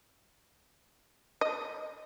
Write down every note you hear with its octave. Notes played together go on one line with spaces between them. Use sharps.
D#5